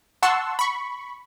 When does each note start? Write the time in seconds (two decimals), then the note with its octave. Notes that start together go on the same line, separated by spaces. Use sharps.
0.23 F#5 A5 C6 C#6 E6
0.59 B5 C#6